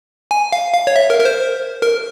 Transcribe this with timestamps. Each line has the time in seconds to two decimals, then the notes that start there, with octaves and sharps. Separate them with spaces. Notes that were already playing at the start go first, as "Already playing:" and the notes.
0.31 G#5
0.52 F5
0.73 F5
0.87 C#5
0.96 E5
1.10 A#4
1.20 A#4
1.25 C5
1.82 A#4